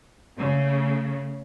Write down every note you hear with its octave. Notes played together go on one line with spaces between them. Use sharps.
C#3 A3